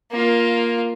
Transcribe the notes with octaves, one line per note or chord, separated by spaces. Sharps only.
A#3 F4